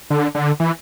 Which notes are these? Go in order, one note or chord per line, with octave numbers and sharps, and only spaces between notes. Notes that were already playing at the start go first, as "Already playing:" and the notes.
D3
D3
E3